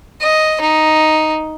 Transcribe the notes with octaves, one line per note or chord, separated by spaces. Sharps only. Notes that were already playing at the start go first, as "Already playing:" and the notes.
D#5
D#4